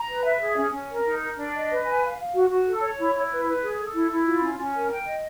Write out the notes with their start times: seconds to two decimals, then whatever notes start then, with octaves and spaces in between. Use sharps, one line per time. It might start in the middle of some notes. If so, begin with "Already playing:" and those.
Already playing: A#5
0.08 B4
0.25 E5
0.41 G#4
0.57 C#4
0.73 C#4
0.89 A#4
1.05 D#4
1.21 A#4
1.37 D4
1.53 D#5
1.69 B4
1.85 G#5
2.01 F5
2.18 F5
2.33 F#4
2.50 F#4
2.65 A4
2.81 C#5
2.98 E4
3.14 E4
3.30 B4
3.46 B4
3.62 G#4
3.78 A4
3.94 E4
4.10 E4
4.26 F4
4.42 C#4
4.58 C#4
4.74 A#4
4.90 G5
5.06 D#5